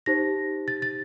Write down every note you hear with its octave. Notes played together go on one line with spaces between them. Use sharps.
D#4 G4 C5 A#6
A6
A6